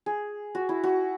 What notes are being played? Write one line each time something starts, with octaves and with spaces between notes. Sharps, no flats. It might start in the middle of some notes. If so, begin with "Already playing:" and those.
G#4
F#4
E4
F#4